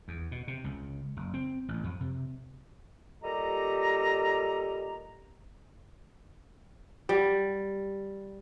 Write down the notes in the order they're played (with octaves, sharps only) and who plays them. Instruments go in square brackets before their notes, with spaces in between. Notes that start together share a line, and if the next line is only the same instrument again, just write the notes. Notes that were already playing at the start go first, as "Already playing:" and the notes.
[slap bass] E2
B2
C3
C#2
F#1
C4
A1
F2
C3
[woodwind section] A#2 G3 G4 A4 D#5 A#5
[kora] G3